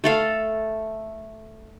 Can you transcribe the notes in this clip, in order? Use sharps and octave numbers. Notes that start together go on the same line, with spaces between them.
A3 A4 F5